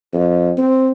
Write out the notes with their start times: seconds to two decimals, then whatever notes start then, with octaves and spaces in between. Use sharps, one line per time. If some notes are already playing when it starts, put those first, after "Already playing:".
0.13 F2
0.58 C4